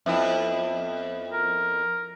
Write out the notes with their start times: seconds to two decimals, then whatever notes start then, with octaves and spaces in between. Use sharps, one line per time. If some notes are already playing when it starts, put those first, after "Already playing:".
0.06 F2 B3 E4 E5
1.33 A#4